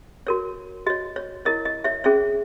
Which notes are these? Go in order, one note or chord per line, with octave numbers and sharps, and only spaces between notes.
F#4 A#4 C#5
F#4 C#5 D#5
C#5
E4 A#4 C#5 D#5
D#5
C#5 E5
C#4 G#4 C#5 E5